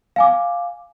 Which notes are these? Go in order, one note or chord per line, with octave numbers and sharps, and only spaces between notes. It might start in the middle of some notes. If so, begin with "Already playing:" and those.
F5 G#5 D6